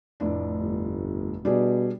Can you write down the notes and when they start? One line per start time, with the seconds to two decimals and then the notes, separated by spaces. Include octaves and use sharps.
0.20 F1 A2 D4
0.58 G1
1.45 B2 G3 D4 G#4